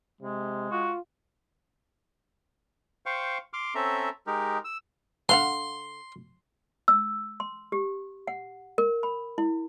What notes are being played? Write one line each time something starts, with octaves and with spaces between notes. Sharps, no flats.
C3 G#3
F4 F#4
C5 F5 G5 C#6
C6 D6 F6
C4 C#4 A4 E5 A#5
G#3 D#4 G4 A#4
E6
D3 F5 F#5 C6
E6
C6
G4
F#5
A#4
B5
E4